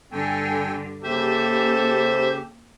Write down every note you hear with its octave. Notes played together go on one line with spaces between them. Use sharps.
G2 D3 A4 G5 G#5
C#3 A#3 G4 A4 C5 E5